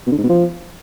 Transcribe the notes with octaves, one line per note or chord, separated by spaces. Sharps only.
B2
D3
G#2
B2
F3